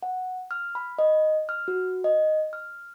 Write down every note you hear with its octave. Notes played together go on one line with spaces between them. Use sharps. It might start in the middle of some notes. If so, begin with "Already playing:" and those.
F#5
F6
B5
D#5
F6
F#4
D#5
F6